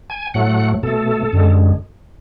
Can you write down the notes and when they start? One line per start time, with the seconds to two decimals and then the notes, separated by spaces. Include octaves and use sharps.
0.10 G#5
0.34 A2 F#3 A3 F#5
0.83 B2 A3 A4
1.33 F#2 D3 G#3